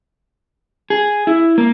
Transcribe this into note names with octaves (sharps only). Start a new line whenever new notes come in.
G#4
E4
A#3